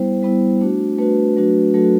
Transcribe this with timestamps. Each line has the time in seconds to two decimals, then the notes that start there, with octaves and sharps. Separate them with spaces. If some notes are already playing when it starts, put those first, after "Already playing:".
Already playing: G3 B3 E4 C5
0.23 G3 B3 E4
0.61 A3 D4 F#4
0.98 A3 D4 F#4 B4
1.36 F#3 A3 D4 F#4
1.74 F#3 A3 D4 F#4 A4
1.84 F#4